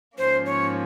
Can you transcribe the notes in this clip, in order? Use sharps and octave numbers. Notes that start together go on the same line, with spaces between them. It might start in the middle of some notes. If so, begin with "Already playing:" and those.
G#2 F3 A#3 C#4 C5
C#5